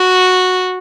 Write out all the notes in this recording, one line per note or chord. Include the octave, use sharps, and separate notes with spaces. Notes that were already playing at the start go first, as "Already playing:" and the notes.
Already playing: F#4